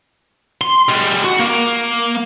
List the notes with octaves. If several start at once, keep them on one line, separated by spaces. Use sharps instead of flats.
C6
G3 G#3
F#4
A#3